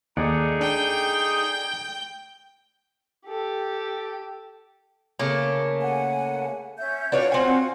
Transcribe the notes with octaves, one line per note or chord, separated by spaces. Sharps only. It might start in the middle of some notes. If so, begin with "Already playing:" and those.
D#2 D#4 G#4 A4 D5 F#5
D4 G5
G4 A4
C#3 A3 A#3
F#5 G#5
C#4 E5 G6
D4 F4 F#4 B4 C#5 F#5
C4 G#5